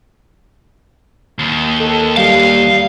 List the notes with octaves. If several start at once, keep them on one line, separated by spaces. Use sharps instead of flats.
D#2
A4
G3 F5